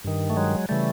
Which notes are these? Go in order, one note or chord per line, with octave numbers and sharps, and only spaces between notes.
G2 D#3
A3
F#3 G#3
C#3 E3 G3 A3